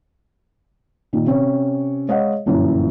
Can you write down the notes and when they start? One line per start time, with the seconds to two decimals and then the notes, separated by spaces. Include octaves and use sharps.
1.13 A#2 D#3
1.26 C3 C#4 C#5
2.08 G#3 C#5 D#5 F5 F#5
2.46 G1 F#2 A#2 E3